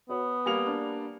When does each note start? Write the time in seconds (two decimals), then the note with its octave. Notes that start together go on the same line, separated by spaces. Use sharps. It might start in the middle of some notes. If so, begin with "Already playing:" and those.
0.09 B3 F#4 C#5
0.46 G3 A#3 G#5 C#7 F7
0.66 D4